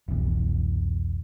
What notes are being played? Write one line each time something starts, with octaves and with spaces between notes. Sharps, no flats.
F1 C2 B2 E3